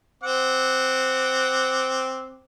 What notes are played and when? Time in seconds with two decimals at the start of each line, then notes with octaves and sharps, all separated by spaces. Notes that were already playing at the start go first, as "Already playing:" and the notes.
0.23 C4 F#5 D6